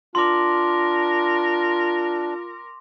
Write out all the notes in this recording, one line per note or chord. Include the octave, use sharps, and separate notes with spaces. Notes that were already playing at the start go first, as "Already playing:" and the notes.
D4 F4 A#4 C6 D6